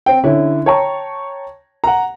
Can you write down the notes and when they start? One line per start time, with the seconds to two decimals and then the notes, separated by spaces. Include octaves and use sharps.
0.06 C4 G5
0.24 D3 C#4 E4
0.66 C#5 G5 A5 A#5 C#6
1.84 F#5 A#5